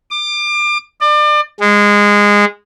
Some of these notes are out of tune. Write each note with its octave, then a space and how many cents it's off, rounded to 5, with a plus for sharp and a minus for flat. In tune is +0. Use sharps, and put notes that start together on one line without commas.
D6 +30
D5 +35
G#3 -15